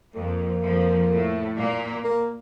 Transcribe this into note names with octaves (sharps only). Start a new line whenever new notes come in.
F2 F3 A#3
F2 F3
A2 A3
A#2 A#3
A#3